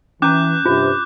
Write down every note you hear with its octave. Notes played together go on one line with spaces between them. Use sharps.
E3 C#4 A#5 D6 F#6 G6
G2 C3 F4 C5